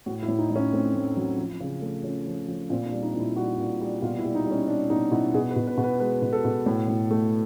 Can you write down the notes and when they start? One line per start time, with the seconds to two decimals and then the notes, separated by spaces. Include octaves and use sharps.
0.06 A2 F#4
0.23 E4
0.28 A2
0.39 D#4
0.50 A2
0.56 C#4
0.72 A3 C4
0.94 A2
1.17 F#3
1.38 F3
1.60 C#3
1.82 A3
2.04 F3 C#4
2.26 F3
2.48 F3
2.70 A#2 C4
2.86 D4
2.92 G3
3.03 D#4
3.14 A#2
3.19 E4
3.36 G3 F#4
3.59 A#2
3.81 G3
4.02 B2 F4
4.19 E4
4.24 G3
4.35 D#4
4.46 G3
4.51 C#4
4.68 G3 D4
4.90 B2 D#4
5.12 B2 E4
5.34 B2 G#4
5.51 B4
5.56 B2
5.67 B4
5.78 B2
5.84 B4
6.00 G#3 B4
6.22 B2
6.33 A4
6.45 B2
6.66 A2
6.88 A2
7.11 A3